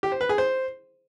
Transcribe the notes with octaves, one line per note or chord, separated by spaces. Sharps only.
G4
C5
B4
G#4
C5